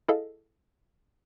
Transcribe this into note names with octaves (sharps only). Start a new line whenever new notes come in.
E4 G#4 A4 D#5 F5